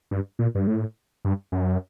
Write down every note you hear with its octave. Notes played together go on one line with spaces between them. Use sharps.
G2
A#2
G2
A2
G2
F#2